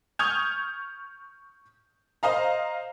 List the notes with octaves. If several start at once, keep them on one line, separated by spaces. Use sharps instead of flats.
C#6 D#6 F6 G6 G#6 F7
C5 D#5 F5 A#5